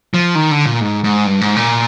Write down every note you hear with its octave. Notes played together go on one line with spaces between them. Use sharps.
F3
D#3
D3
A#2
G#2
G#2
G2
G#2
A#2